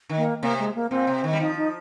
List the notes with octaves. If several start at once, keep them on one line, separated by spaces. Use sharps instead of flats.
D#3
A#3
C3 A#3
G#3
A#3
A#2 C4
C3
D#3
G3
F3 D#4
D#4